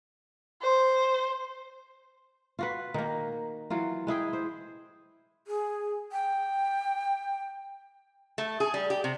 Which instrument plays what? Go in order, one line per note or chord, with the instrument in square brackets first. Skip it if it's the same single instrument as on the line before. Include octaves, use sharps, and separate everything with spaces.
[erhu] C5
[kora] F4 F#4 B4
D#3 A#3
E3 F#3 F4
G#3 E4 G#4 G5
C5
[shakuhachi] G#4
G5
[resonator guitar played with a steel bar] A3
G#4
G3
G4
C3